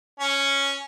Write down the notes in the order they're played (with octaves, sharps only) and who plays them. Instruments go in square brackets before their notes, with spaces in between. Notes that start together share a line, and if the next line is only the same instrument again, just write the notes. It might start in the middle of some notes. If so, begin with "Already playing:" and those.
[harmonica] C#4